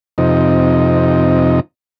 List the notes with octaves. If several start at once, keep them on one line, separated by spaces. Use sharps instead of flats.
F2 C3 D#4